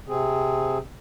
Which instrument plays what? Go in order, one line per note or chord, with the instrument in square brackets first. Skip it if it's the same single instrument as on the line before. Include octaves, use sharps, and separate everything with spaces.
[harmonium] C3 C4 G#4